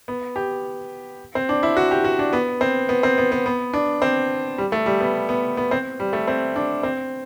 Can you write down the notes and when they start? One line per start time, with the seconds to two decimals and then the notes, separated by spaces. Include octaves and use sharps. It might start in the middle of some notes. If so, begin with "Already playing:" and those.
0.08 B3
0.36 G4
1.35 C4
1.49 D4
1.63 E4
1.77 F#4
1.91 G4
2.04 F#4
2.19 D4
2.33 B3
2.61 C4
2.89 B3
3.03 C4
3.18 B3
3.32 B3
3.46 B3
3.73 D4
4.02 C4
4.58 G3
4.72 A3
4.86 G3
5.00 B3
5.29 B3
5.57 B3
5.71 C4
6.00 G3
6.13 A3
6.28 C4
6.56 D4
6.83 C4